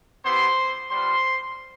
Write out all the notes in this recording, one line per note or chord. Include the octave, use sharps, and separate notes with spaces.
B3 E4 G4 C5 C6
G3 B3 F4 C5 C6